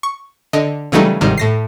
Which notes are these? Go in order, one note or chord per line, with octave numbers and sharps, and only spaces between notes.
C#6
D3 D#5
C#3 E3 F#3 G3 A3 D#4
G1 G#2 C3 D#3 G3
A2 A#6 C7